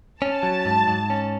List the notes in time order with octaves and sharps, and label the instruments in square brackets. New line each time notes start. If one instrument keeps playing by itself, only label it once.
[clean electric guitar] C#4 [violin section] A5
[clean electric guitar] F#3
G#2
G#2
C#4